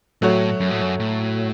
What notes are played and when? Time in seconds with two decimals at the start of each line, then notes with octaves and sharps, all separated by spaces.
0.22 A2 F#3 A3 F#4 C#5
0.60 F#2
0.71 A2
0.81 F#2
1.00 A2